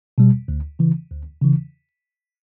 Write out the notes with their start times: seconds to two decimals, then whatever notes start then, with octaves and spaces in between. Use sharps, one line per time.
0.18 B2 G3
0.48 D2
0.79 C#3 E3
1.11 D2
1.41 C#3 E3